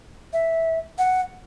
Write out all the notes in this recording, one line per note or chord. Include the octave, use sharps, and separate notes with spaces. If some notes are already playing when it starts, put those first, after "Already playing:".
E5
F#5